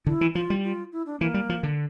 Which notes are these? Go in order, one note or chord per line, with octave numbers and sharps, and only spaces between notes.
D3 E4
E3
F3 F4
G3
F4
E4
D4
E3 A#3
G3
F3
D3